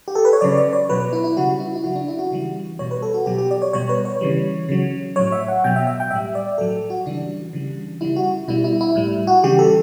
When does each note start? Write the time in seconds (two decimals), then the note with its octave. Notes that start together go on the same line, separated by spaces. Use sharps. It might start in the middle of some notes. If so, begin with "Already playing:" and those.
0.08 G4
0.15 A4
0.25 B4
0.33 C#5
0.41 C#3 F#3 D5
0.57 D5
0.73 C#5
0.89 B2 F#3 B4
1.00 B4
1.13 E4
1.24 E4
1.37 C#3 G3 F#4
1.60 E4
1.75 E4
1.84 C#3 F#3 F#4
1.95 D4
2.08 E4
2.19 F#4
2.31 C#3 E3 G3
2.79 B2 G3 C#5
2.91 B4
3.02 A4
3.14 F#4
3.26 B2 F#3 G4
3.38 G4
3.51 D5
3.62 C#5
3.73 B2 G3 C#5
3.89 B4
4.05 C#5
4.21 C#3 E3 G3
4.69 C#3 F#3
5.16 A2 F#3 C#5
5.32 E5
5.48 F#5
5.64 B2 F#3 G5
5.76 E5
5.87 E5
6.00 G5
6.11 A2 G3 E5
6.35 D5
6.58 A2 F#3 A4
6.90 F#4
7.06 C#3 E3 G3 D4
7.53 C#3 E3 G3
8.01 C#3 G3 E4
8.16 F#4
8.48 B2 G3 E4
8.64 E4
8.81 E4
8.95 A2 G3
9.27 F#4
9.43 C#3 E3 G3 G4
9.59 A4